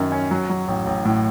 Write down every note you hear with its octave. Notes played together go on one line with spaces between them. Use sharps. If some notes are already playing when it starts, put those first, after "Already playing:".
Already playing: F#2 D#3 C#4
C#4
F#3
F#3
A1
A1
A2